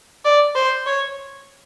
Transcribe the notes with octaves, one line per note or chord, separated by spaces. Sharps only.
D5
C5
C#5